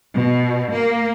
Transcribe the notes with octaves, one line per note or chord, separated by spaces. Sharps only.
B2
A#3